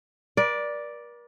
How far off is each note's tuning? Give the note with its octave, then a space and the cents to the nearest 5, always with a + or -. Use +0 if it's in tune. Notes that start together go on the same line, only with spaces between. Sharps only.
A#4 +45 D5 +0